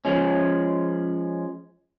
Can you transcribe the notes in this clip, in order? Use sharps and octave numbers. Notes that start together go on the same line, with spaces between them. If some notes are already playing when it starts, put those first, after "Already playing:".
F3 G#3 C#4